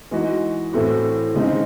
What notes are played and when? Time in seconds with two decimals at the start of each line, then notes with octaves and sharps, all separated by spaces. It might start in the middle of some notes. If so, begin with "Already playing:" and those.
0.11 E3 G#3 D#4 F#4
0.73 A2 E3 A3 C4 F#4
1.35 C#3 G#3 C4 D#4